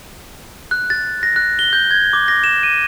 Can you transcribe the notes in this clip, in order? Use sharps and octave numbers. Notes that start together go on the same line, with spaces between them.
F#6
A6
A#6
F#6
G7
G6
G#6
D6
A#6
E7
D#7